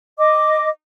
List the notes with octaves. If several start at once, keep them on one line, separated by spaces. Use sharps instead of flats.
D#5 D6